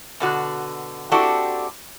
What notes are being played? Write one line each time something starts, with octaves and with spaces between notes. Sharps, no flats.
B2 D3 F#4
C4 D4 E4 F#4 G4 A4